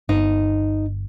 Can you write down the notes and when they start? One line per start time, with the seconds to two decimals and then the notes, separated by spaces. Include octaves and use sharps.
0.09 G1 D#4